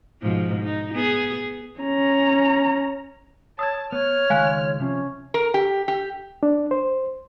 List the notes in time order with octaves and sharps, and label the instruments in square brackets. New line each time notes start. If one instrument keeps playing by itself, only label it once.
[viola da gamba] G#2 B2 F3
D#4
B3 G#4
[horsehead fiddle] C#4 A#5
[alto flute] C#5 [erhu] A5 [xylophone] D#6 E6 G#6
[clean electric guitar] B3 [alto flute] C#5 [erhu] F6
[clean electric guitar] C#2 D#3 G#3 [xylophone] F5 G#5 F#6
[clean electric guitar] C3 F3 [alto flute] C#4
[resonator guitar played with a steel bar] A#4
G4
G4
[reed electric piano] D4
C5